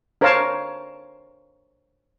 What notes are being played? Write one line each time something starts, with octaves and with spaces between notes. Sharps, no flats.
D4 A#4 C5 C#5 F5 A5